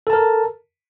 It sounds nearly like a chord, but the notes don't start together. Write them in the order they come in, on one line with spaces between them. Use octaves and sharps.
A4 A5 A#4